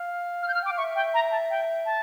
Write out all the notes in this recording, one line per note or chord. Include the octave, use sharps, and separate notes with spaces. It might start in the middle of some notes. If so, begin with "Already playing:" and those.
Already playing: F5
F6
G6
F6
G5
D6
F5
E5 C#6
G5
A#5
A5
G5
A5